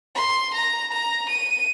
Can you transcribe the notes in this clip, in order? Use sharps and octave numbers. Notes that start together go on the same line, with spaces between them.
C6
A#5
A#5
D#7